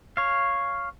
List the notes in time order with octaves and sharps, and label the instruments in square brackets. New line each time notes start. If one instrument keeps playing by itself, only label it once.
[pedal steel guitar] C#5 F5